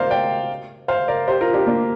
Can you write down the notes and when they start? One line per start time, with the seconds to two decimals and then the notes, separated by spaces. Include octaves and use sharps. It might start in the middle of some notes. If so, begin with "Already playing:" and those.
Already playing: A#4 C5 D5 F5
0.10 D5 G5
0.88 C5 F5
1.08 A#4 D5
1.28 G4 C5
1.41 F4 A#4
1.53 D4 G4
1.66 A#3 D4